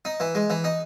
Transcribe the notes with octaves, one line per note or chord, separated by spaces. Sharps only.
D#4
E3
G#3
E3
D#4